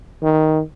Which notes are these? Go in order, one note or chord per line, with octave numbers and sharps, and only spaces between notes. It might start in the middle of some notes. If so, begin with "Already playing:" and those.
D#3